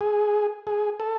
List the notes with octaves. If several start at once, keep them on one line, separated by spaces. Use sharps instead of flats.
G#4
G#4
A4